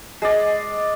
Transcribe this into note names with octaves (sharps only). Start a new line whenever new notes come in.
G#3 D5